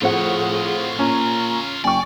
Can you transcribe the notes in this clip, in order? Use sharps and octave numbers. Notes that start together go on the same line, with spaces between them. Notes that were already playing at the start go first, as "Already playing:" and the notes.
A2 F3 C4 F4 G#4 C#5 F#5
A#2 C#4 A#5
F#1 D5 G5 G#5 C#6